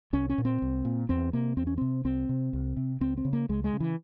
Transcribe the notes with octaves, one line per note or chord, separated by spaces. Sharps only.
C2 C#4
C#4
A#2
C4
C2
A#2
E2 C4
C3 A#3
E2 C4
C#4
C3 C4
C2 C4
C3
C2
C3
C#2 C4
C4
C#3
A#3
C#2 G#3
G#3
C#3
E3